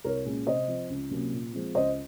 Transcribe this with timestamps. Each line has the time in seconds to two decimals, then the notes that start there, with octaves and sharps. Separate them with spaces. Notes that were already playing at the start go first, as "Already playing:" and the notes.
0.04 C2 A#4 C#5
0.25 A#2 G#3 C#4
0.47 C3 C5 D#5
0.68 F3 C4
0.90 C#2
1.11 C3 F#3 A#3 C#4
1.33 A#2
1.53 F3 G#3 C4
1.75 C#2 C5 D#5